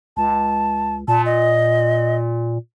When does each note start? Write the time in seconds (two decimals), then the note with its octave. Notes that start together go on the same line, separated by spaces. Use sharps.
0.17 C#2 A5
1.08 A#2 A5
1.26 D#5